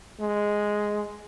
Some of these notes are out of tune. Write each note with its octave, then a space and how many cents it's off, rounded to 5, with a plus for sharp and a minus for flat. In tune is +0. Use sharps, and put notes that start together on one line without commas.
G#3 +0